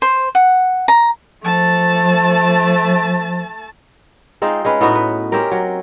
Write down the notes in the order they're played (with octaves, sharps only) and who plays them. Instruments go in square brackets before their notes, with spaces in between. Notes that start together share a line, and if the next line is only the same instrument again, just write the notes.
[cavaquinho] C5
F#5
A#5
[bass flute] F3 [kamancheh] A3 A5
[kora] G#3 C4 D#4 F4
G#3 C#4 B4
A2 B3 D#4 F#4
B4
C4 C#4 G4 A#4
F#3